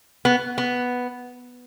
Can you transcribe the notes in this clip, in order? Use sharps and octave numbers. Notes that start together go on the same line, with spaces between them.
B3
B3